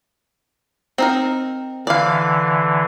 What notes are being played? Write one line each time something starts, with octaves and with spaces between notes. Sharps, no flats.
C4 D#4 A#4
D3 E3 D5 F5